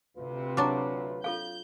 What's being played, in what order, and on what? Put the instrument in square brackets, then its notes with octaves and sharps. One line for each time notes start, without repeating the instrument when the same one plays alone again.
[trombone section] D2 F4 B4 [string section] C3
[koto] F#3 D4 [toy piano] A#5 D6
[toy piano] F4 A4 F5 [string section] G6